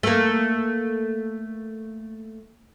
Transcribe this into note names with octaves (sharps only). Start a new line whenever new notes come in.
A3 A#3